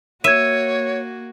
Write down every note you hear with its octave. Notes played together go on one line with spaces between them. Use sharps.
A#3 F#4 C#5 E5 G#6 D#7